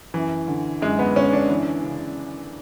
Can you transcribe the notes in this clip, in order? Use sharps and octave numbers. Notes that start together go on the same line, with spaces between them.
F#2 E3
D3
F#2 G#3
B3
D3 C#4
D4
E3
C#3